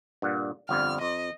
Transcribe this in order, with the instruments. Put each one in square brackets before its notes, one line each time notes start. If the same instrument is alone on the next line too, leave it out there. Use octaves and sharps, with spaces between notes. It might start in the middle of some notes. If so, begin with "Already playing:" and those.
[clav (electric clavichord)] G2 A#2 F#5
[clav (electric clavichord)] G1 F2 G3 [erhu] F6
[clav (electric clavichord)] F2 [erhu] D#5